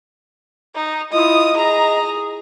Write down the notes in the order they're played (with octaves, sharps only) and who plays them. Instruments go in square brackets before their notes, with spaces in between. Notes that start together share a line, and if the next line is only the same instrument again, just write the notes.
[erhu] D#4
[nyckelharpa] E4 F4 [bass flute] D#5 [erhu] D#6
[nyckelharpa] G#4 [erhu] A#5